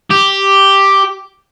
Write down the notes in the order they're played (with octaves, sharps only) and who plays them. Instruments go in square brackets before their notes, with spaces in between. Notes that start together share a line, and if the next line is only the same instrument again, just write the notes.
[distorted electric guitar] G4